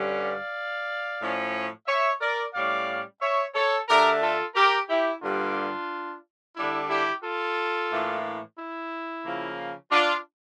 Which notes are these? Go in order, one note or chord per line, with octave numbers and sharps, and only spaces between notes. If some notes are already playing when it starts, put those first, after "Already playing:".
Already playing: G2 D3 G3 C#4
D5 F5
A2 F3 C#4
C#5 E5
A#4 D5
A2 G3 C#4 D5 F5
C#5 E5
A4 C#5
D3 A3 D4 G4 A#4
F4 A4
G4 A#4
E4 G4
G2 D3 G3 A#3 D4 F4
D3 G3 D4 E4
E4 G4
F4 A4
A2 E3 A#3 D4
E4
C#3 F3 A#3
D4 F4